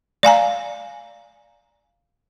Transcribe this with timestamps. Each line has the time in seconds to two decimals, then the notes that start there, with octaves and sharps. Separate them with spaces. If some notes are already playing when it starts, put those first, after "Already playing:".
0.23 D5 F5 G#5 A#5